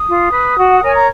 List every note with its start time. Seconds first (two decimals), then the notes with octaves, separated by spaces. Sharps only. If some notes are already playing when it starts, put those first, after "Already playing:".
Already playing: D#6
0.08 F4
0.32 B4
0.58 F#4
0.72 F#5
0.82 A#4 C#5 G#5
0.95 A#5